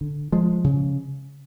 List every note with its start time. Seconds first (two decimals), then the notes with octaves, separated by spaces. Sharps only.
0.01 D3
0.32 F3 G#3
0.64 C#3